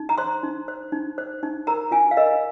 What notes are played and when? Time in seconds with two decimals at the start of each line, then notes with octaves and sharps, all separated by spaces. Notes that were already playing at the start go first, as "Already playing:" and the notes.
Already playing: D#4
0.09 A#5
0.18 C5 C6
0.43 D#4
0.68 C5
0.92 D#4
1.18 C5
1.43 D#4
1.67 A#4 A#5
1.91 F4 G#5
2.11 F5
2.17 A#4 D#5